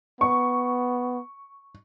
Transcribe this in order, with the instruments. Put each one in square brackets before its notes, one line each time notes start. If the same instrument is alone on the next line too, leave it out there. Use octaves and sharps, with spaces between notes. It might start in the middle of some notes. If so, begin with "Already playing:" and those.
[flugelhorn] B3 [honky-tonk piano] C#6